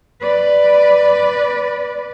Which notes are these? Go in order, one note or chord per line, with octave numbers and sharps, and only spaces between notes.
B4 D5